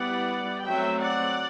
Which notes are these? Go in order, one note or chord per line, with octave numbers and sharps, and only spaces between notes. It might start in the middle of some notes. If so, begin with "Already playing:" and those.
Already playing: G3 B3 E4 D5 F#5
F#3 A3 C4 E5 G5
D5 F#5